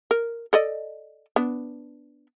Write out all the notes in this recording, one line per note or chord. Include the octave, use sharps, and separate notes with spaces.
A#4
A4 D5 D#5
B3 D4